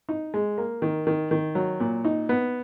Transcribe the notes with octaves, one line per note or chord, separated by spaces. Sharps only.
D#4
G#3
A#3
D#3
D#3
D#3
F#3
A#2
D#4
B3